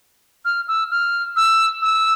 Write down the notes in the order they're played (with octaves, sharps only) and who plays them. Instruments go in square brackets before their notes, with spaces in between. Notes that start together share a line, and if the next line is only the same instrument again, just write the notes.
[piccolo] F6
E6
F6
E6
E6